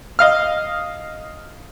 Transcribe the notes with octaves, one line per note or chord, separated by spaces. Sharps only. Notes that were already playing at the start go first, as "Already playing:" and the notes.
D#5 F5 F6